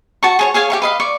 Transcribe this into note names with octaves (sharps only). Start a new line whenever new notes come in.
F#4 A5 C#6
G#4 C#5 C#6
G#4 C#5 F5 G#5
G4 F5 C#6
B4 D#5 F5
D5 C#6